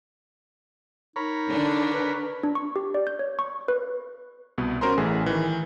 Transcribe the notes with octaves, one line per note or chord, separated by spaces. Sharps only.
D#4 A#4 C#5 B5
D3 D4
B4
D4
C#6
G4
D5
G6
C#5
C#6
B4
C2 B2 B3
C#4 F#4 A#4 C5 A#5 C6
A1 E3 A3 G#4
D#3 E3